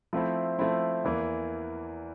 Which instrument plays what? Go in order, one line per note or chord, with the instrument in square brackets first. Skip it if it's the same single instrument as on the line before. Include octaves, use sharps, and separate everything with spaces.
[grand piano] F3 A3 C4 E4
F3 A3 C4 E4
E2 E3 A#3